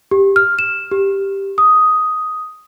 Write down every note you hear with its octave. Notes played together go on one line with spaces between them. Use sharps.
G4
F6
E7
G4
D#6